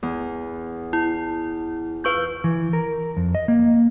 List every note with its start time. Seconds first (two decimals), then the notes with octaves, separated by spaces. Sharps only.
0.03 E2
0.93 E4
2.04 F4 B4 F5 C#6 G6
2.44 E3
2.73 A#4
3.17 F2
3.35 D#5
3.48 A#3